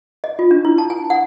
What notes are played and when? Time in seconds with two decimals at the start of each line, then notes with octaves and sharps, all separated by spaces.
0.24 D#5
0.39 F4
0.51 D4
0.65 E4
0.78 A5
0.90 G#5
1.10 F#5